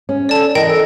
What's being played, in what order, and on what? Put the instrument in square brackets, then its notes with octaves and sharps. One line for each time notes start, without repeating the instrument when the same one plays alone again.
[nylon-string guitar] C#4
[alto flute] A4 [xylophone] D5 A5
[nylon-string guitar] E3 [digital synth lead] A#4 [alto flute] D#5 [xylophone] G5
[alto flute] A4